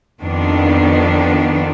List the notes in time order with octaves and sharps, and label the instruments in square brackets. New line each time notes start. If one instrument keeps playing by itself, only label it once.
[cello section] F2 D#3 B3 D4